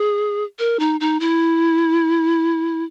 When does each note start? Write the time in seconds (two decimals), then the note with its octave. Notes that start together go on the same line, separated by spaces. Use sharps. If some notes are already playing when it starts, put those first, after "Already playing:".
Already playing: G#4
0.59 A#4
0.80 D#4
1.00 D#4
1.20 E4